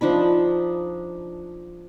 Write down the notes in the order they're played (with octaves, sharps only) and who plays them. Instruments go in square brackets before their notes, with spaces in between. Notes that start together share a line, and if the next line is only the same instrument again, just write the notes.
[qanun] F3 D4 D#4 B5